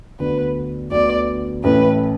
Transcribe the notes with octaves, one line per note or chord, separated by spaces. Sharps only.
D2 D3 B3 B4
D2 D3 B3 D5
A1 A2 A3 E4 B4